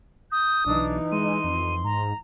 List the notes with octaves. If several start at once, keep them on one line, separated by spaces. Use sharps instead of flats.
D#6 G6
B1 E3 D4 D#4
G#3 C6 D#7
F2
G#2 A#5